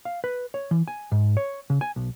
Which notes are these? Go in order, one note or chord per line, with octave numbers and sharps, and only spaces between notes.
F5
B4
C#5
E3
G#5
G#2
C#5
C#3
G#5
B1